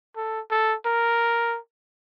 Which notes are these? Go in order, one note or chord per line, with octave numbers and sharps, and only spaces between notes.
A4
A4
A#4